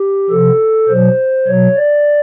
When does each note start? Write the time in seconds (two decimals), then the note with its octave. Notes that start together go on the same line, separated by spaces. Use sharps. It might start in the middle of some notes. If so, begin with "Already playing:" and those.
Already playing: G4
0.30 C3 F3 A4
0.89 B2 F#3 C5
1.47 B2 F#3 C#5
1.77 D5